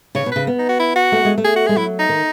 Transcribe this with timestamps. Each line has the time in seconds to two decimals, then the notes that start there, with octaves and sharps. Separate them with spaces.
0.15 C#3 C#5
0.26 B2
0.31 C#3 B4
0.47 B3
0.59 D#4
0.69 F#4
0.79 E4
0.96 F#4
1.12 A3
1.25 G#3
1.38 A3
1.44 G#4
1.56 F#4
1.66 G#4
1.69 G#3
1.77 F#3 E4
1.99 D#4
2.09 D#3